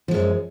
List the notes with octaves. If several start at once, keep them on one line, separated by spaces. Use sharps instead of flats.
F#2 F3 G#3